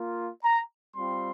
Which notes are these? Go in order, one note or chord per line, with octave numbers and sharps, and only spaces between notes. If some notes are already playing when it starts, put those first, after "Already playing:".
Already playing: A#3 F4
A#5
G3 C4 F4 C6